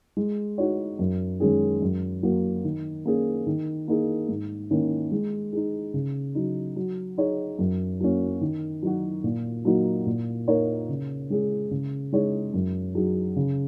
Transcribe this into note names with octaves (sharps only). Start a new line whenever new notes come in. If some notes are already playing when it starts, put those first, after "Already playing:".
G#3
D#4 F#4 C#5
F#2
D#3 G#3 C#4 G#4
F#2
F#3 A#3 F#4
D#3
A#3 C#4 G#4
D#3
A#3 D#4 G#4
G#2
D#3 A#3 C#4
G#3
D#4 G#4
C#3
F#3 D#4
F#3
D#4 G#4 C#5
F#2
F#3 A#3 C#4
D#3
F#3 D#4 F#4
A#2
F#3 A#3 D#4 F#4
A#2
A#3 D#4 A#4 C#5
C#3
G#3 C#4 G#4
C#3
G#3 D#4 G#4 C#5
F#2
F#3 D#4 G#4
C#3